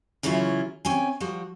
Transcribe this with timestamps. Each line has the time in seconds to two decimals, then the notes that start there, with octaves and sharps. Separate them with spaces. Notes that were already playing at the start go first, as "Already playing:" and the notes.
0.23 C#3 E3 F#3 C#4 E4 F4
0.85 C3 C#4 G5 G#5
1.20 F3 G3 F#4